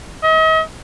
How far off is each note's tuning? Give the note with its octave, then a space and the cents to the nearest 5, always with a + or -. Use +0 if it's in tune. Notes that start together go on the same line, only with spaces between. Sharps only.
D#5 +40